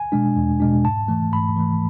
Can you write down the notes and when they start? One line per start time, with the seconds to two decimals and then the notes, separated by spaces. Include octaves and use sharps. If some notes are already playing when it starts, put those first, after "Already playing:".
Already playing: G#5
0.12 B2 G#3 D4
0.36 E2
0.60 B2 G#3 D4
0.85 G#2 A5
1.08 E3 A3
1.32 G#2 B5
1.56 E3 A3